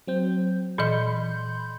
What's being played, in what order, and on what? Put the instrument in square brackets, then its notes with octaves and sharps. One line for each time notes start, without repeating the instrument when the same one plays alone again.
[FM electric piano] F#3 C4 G6
[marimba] A#2 E3 D#5 [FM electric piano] B5 C6 G6